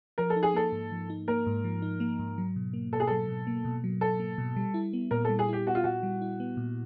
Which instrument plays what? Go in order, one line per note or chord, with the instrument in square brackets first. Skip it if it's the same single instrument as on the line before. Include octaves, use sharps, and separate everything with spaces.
[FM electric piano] F3 [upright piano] A#4
[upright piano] A4
[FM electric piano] D#4
[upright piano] G#4
[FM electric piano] A#3 [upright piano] A4
[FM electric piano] G#2
F3
D#4
[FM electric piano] A#3 [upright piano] A#4
[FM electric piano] G#2
F3
D#4
A#3
G#2
F#3
B2
A#3
[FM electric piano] B2 [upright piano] A4
[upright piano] G#4
[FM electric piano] F#3 [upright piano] A4
[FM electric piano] B2
A#3
B2
F#3
[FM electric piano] B2 [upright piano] A4
[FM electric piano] A#3
B2
G3
E4
B3
[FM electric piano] A#2 [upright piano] A#4
[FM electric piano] G3 [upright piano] A4
[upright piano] G#4
[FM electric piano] E4 [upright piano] G4
[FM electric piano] B3 [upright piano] F#4
[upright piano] F4
[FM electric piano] A#2 [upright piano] F#4
[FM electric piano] G3
E4
B3
A#2